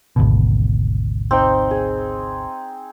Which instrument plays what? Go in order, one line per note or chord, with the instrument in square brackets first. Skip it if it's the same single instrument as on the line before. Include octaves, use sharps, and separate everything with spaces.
[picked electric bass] G#1 D2 B2
[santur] C4 D#4 G5
G#4